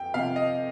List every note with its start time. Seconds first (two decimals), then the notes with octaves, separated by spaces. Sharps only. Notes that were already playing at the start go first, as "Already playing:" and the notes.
Already playing: F2 G5
0.14 C3 F3 F5
0.36 D#5